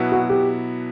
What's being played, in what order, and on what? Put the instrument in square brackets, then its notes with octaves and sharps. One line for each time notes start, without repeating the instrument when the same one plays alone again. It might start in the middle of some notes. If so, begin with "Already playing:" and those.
Already playing: [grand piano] B2 F#3 B3 E4
[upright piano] F#4
G4